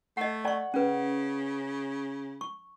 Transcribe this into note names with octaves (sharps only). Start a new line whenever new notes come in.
A3 D#5 F#5
D5 F#5 C#6
C#3 C#4 B4
C#6